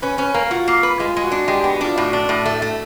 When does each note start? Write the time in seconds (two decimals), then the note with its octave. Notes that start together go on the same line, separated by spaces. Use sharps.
0.02 C#4 B4
0.18 C#4 B4
0.34 A#3 A#4
0.51 F4 F#4
0.68 A#3
0.83 B4
0.99 G#3 F4
1.17 G#3
1.24 F#4
1.32 D4
1.48 G#3 G4
1.60 B3 G4
1.73 F#4
1.81 D4 F4
1.97 A2 F#4
2.13 D4
2.29 A2
2.45 A3
2.62 A3